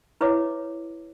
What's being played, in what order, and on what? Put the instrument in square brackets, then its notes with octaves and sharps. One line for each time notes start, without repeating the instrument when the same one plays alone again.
[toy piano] E4 B4 C#5 D#5 E5 D6